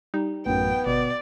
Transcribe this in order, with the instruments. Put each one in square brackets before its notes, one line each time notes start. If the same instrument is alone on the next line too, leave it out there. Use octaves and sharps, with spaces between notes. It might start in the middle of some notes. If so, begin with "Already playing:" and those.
[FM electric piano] G3 [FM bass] D#4
[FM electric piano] A1 F#2 [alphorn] B3 [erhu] G5
[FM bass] G1 [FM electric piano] B2 [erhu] D5